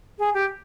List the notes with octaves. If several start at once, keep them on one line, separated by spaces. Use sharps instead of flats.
G#4
G4